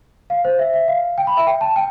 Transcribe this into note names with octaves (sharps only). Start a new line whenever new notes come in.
F5
C5
E5
E5
F5
G5
B5
E5
G5
A5
G5